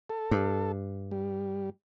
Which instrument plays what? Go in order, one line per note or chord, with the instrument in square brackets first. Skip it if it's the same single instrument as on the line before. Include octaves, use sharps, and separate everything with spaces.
[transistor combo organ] A4
[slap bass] G2
[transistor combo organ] G3